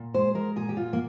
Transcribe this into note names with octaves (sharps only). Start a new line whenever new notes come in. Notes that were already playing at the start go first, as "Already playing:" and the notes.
Already playing: A#2
G#3 C5
G#3 A#4
A#2 G#4
G4
A#2 F4
A#3